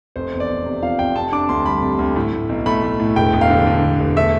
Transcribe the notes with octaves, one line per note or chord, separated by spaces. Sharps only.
F1 C5
E2
D5
F1
C3
F3 F5
F1 G5
C3 A5
D4 D6
D2 C6
G3 B5
C3
D2
A2
A2
B1
A3 B5
A3
A2
E1 G5
E1
F5
D3
D3
E1
E1
A3 E5